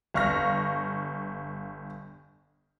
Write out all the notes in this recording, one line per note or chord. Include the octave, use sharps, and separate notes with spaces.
G1 F5 C#6 F6 A#6